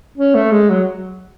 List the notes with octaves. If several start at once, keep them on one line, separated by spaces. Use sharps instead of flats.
C#4
A3
G#3
F#3